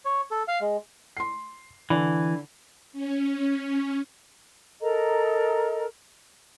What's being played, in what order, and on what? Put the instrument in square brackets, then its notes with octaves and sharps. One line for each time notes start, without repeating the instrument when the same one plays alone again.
[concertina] C#5
A4
F5
G#3
[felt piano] C6 C7
[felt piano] D3 [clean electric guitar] E3
[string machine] C#4
[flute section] A4 A#4 D#5 A#5